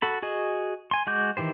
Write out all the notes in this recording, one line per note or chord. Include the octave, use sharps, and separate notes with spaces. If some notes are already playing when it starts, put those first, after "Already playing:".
F#4 A4 B5
F#4 G#4 D#5
G#5 C6
G#3 F#4 D6 G6
D#3 E3 G4 C5